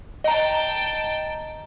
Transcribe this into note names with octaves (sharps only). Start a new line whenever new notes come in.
D#5 G5 A5 A#5